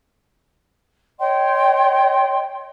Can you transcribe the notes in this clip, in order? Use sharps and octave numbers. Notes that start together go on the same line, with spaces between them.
C#5 D#5 G5 C6